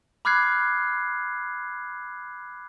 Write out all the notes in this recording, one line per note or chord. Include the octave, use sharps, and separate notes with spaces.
B5 D6 F6 F#6 G#6 C7